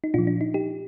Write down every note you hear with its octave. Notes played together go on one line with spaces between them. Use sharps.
D#4
A#2 F3 D4 F4
D4
D#4
D#4 G4